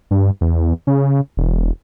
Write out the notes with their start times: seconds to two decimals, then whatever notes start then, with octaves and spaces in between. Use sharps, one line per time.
0.11 G2
0.41 E2
0.87 C#3
1.37 E1